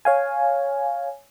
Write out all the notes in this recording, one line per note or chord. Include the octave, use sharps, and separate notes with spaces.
C#5 F5 G#5